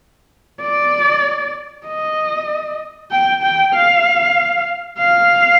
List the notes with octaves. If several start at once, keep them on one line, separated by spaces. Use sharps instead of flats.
D5
D#5
G5
G5
F5
F5